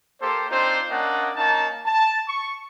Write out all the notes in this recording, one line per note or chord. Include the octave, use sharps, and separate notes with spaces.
A#3 G4 A4 C5
C4 D4 D#4 F4 C5
A#3 C#4 D4 D5 D#5 F#5
A#3 C#4 D#4 A5
A5
C#6